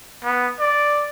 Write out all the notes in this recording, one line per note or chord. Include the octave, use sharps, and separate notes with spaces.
B3
D5